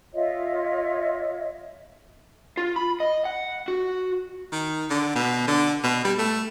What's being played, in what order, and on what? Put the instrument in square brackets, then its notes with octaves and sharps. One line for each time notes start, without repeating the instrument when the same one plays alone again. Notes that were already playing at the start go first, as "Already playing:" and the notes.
[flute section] F4 C#5 D#5 E5
[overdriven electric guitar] F4
B5
D#5
F#5
F#4
[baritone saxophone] D#3
D3
B2
D3
B2
G3
A3